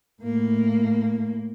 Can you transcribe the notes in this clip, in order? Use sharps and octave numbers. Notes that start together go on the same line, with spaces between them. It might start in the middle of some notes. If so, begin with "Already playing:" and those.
A2 A#3